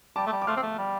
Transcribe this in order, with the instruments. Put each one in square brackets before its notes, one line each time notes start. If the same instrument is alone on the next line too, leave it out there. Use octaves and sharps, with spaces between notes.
[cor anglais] G3 [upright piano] A5 D6
[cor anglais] A3
G3
[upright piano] D6
[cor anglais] A3 [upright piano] C6 F6
[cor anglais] C4
A3
G3